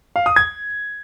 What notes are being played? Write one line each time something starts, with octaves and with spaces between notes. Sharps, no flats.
F5
D#6
G#6